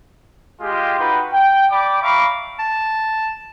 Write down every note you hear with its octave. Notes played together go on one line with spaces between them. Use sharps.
G#3 F4 G4
D#4 F4 F#4 B4 F#5 G5
G5
D5 G5 B5 D6
E5 F5 A#5 B5 C#6 D6
A5